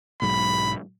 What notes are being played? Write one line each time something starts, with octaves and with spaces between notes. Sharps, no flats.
B1 G#2 F#3 B5